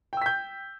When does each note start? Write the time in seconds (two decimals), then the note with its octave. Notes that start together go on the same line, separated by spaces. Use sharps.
0.13 G5
0.17 E6
0.22 B6
0.26 G6